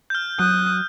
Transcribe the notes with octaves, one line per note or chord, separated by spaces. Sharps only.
F6 G6
F#3 D#6 F#6